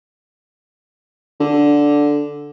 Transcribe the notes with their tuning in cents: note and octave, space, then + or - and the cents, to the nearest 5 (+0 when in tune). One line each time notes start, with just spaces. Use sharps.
D3 -5